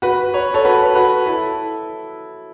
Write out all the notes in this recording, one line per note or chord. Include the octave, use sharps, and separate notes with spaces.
F#4 B4
C#5
A4 C#5
F#4 B4
F#4 B4
E4 A4